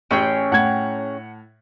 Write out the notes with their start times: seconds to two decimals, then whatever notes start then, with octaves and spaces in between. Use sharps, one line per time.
0.11 A1 C#4 G#4 G5
0.52 A2 F#5 G#6